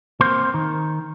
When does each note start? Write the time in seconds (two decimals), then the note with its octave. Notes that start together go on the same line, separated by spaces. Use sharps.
0.21 A#3 C4 C5
0.54 D#3